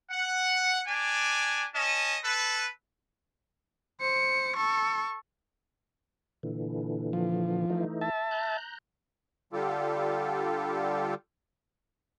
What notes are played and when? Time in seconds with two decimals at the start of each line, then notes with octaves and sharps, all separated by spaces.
0.11 F#5
0.87 D4 G4 G#5
1.74 C#4 D#5 A5
2.24 A4 B4
4.01 C5 C#7
4.56 A4 C#6
6.43 A#2 D3 E3
7.13 F3
7.70 E3 A3 D#4
8.01 E5 A5
8.31 A#5 F#6 G6
9.53 D3 G3 F4 G4 A4